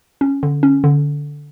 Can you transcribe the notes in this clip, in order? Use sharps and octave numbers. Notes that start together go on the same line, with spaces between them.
C#4
D3
C#4
D3